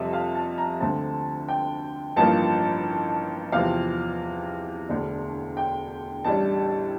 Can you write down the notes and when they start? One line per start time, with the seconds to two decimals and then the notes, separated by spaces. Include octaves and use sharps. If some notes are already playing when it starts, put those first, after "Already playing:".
Already playing: F2 C3 G3 C4 A4 E5
0.13 F5
0.35 A5
0.58 A#5
0.80 D2 D3 A3 C4 A5
1.48 G5
2.16 A1 G2 F3 A#3 A5
3.52 E2 C3 F3 C4 F5
4.89 E1 D2 D3 A3 D4
5.57 G5
6.24 A1 A2 G3 D4 A5